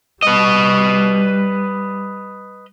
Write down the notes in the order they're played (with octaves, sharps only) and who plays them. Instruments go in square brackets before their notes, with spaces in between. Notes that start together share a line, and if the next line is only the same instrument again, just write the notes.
[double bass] G3 [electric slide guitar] B4 D#5